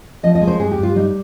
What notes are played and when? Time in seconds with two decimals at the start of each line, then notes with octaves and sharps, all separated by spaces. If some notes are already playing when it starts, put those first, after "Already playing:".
0.23 F3 D#5
0.35 D#5
0.41 G#3
0.47 C5
0.59 G2 G#4
0.71 G4
0.78 G2
0.83 F4
0.96 G3 D#4